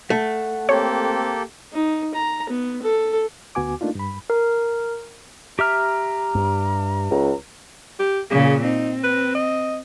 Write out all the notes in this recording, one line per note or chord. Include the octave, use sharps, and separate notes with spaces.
A3 F#5
A#3 C4 G4 A4 C#5
D#4
A#5
B3
A4
D2 B3 F#4 G#5 D6
A3 A#3 D4 D#4 F4
G2 B5
A#4
G4 E5 A#5 F6
G2
C#2
G4
A#2 C#3 G#4
C4 D#4
B4
D#5